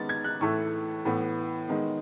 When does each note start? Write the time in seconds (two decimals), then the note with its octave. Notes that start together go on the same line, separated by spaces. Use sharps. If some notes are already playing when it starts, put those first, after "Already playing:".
Already playing: D#3 G#3 B3 A6
0.09 G#6
0.24 F#6
0.41 A2 E3 A3 C#6
1.05 A2 E3 B3
1.69 D#3 G#3 B3